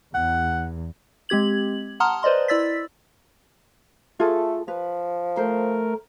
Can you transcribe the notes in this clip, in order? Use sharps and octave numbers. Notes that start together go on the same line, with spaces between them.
E2 F#5
G#3 C4 G4 G#6 F#7
F#5 A5 A#5 C6 D#6 F6
B4 C5 D5 D#5 C6
E4 D5 E6 A6 B6
A3 F4 G#4 A4
F3 B4
A3 A#4 C5